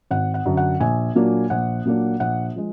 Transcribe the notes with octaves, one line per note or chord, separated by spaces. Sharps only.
G#1 F#5
F#5
F#2 D3
F#5
A#1 G#5
A#2 F#3 A#3 D4
A#1 F#5
A#2 F#3 A#3 D4
A#1 F#5
F3 G#3